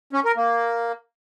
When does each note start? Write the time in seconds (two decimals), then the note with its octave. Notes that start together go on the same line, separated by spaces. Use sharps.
0.13 C#4
0.25 A#4
0.37 A#3